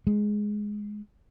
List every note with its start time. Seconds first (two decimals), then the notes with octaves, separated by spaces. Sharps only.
0.07 G#3